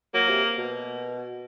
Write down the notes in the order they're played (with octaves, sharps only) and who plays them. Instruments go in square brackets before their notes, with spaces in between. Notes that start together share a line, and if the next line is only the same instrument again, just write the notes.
[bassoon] F#3 [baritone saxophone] A#3
[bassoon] C3
B2